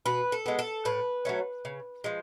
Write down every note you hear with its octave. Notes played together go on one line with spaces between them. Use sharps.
B2 B4
A4
G#3 B3
A4
A2 B4
F#3 A3 C#4
C#3
F3 G#3